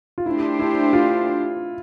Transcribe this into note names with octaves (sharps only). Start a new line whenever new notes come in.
F4
A3 D4 E4 G4 C5
E4
F4